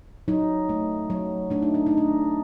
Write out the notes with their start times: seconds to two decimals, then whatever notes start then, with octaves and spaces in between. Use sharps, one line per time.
0.28 F#3 D#4
0.69 A3
1.10 F#3
1.50 A3 D4
1.62 D#4
1.74 D4
1.86 A3 D#4
1.97 D4